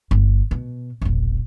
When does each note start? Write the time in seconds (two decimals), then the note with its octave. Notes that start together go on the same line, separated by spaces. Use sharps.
0.11 G1
0.51 B2
1.01 E1 A#1